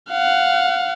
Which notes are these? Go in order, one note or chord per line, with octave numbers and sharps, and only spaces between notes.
F5 F#5